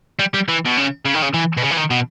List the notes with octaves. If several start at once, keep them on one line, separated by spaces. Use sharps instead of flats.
G3
G3
E3
B2
C#3
C#3
D#3
C#3
E3
B2
C#3
E3
D#3
B2